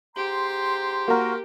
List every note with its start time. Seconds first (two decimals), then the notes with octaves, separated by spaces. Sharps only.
0.16 G#2 G4 A#5 C6
1.08 A#3 F#4 A#4